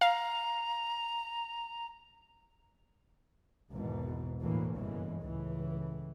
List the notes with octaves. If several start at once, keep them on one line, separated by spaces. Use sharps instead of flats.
F5 A#5
G#1 E2 G#2 B2 E3
D2 A2 E3 A#3
G1 F#2 C#3 E3 G#3
C#2 A2 E3